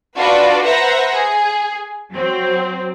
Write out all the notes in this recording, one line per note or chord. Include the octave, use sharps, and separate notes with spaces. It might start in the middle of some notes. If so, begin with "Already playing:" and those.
D4 F4 F#4 B4 D5
B4 C5 E5 F#5 A#5
G#4
F#3 C4